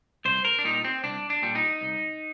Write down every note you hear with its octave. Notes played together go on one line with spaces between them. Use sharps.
C2 C5
A#4
D4
A#2 G3 D#4
C4
C2 D4
D4
A#2 G3
D#4
C2